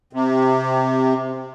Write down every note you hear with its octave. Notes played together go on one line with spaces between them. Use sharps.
C3